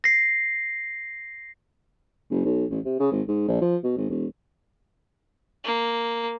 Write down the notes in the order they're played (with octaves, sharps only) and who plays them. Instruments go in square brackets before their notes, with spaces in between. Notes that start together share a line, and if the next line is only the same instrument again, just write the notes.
[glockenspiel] A#6 C7
[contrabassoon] F#1
B1
A1
C3
C#3
G#1
G#2
A#1
F3
B2
G#1
E1
[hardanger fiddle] A#3